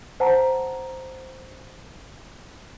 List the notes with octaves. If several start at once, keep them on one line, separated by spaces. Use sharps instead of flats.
C5 F#5 A5 A#5